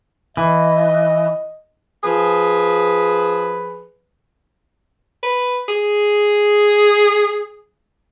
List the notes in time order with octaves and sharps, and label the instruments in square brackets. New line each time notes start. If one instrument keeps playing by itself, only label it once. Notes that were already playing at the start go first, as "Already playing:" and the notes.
[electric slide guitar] E3 [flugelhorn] D#5
[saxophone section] F3 G#4 B4
[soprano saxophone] B4
G#4